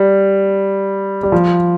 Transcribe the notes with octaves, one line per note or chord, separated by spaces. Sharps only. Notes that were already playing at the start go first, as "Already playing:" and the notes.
Already playing: G3
G3
F3